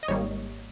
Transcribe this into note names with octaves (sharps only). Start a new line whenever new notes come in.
D#5
G#1 G#2 G3 A#3 C#5